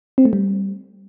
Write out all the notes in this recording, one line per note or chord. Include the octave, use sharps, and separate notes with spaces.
C4
A3
G3